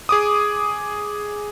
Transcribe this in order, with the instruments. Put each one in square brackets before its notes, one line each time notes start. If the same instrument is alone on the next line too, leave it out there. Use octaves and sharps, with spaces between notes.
[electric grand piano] G#4 D6 D#6